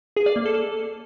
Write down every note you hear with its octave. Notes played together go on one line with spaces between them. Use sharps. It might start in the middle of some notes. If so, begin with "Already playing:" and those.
G#4
D5
A#3
A4